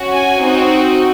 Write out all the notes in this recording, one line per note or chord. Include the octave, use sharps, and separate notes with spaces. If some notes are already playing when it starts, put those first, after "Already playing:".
Already playing: C#4 F#4
G#5
C4 D#4 F#4